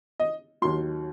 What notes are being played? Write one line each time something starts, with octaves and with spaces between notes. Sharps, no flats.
D#5
D#2 D#3 F#3 C6